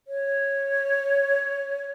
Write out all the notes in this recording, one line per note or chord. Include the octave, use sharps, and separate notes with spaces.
C#5